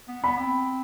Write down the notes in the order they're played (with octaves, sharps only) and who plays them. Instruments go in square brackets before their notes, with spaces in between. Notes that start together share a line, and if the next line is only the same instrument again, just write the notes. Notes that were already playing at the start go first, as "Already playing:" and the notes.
[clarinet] B3
[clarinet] B3 [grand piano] B5
[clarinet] C4